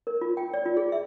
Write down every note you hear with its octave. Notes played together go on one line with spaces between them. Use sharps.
A#4
F4
G5
D5
F4
G#4
E5